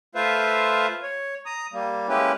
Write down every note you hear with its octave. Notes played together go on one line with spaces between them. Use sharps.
A3 F4 B4 C5 E5 F5
C#5
A#5 D#6
G3 A#3
G#3 A#3 C#4 E4 G4 B4